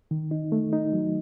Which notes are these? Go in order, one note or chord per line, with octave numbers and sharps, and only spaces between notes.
D#3
D#4
A3
D#4
F#3